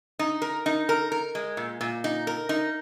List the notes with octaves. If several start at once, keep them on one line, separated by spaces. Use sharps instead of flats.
D#4
A#4
D#4
A#4
A#4
G#3
A#2
A#2
D#4
A#4
D#4